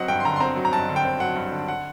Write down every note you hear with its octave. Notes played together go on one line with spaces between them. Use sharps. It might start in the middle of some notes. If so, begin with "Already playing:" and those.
Already playing: F#3 C4 D#5 F#5
G2 G5
C6
D3 A#5
C6
C4 A#5
F#3
A#5
G2 A5
D3
G5
C4
F#3 F#5
G2
D3
F#5